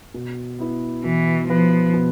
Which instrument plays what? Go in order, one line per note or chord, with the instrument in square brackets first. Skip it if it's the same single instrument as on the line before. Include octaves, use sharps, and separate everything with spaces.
[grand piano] B2
B3 E4 B4
[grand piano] B2 [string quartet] E3
[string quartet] F3 [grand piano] B3 E4 B4
[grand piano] B2